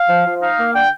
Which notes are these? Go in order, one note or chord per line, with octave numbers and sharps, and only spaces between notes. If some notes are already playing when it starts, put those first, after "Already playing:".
Already playing: F5
F3
F3
D#4 F5
A#3
D3 G5